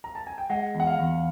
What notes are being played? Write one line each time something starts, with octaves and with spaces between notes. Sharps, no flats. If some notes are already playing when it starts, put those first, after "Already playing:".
A#5
A5
G#5
G5
G#3 F#5
E2 F#5
F5
E2